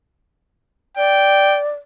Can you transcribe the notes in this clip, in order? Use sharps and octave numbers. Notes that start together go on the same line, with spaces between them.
D5 G5